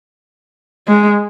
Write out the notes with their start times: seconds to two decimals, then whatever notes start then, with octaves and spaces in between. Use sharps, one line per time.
0.88 G#3